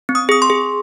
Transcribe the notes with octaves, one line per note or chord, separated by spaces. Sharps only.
C4
D#6
G#4 D#6
C6
G#4